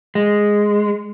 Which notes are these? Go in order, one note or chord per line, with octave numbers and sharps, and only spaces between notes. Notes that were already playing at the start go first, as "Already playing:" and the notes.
G#3